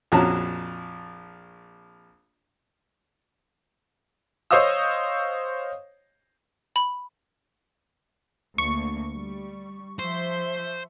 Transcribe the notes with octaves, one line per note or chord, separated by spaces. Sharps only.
A#1 F2 C#4 F#4 A5 A#5
C5 C#5 D#5 F5 D#6 E6
B5
D2 A#3 C#6
G3
F3 C5 E5